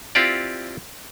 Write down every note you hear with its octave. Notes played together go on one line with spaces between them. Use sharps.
C4 E4 F4 G4 D5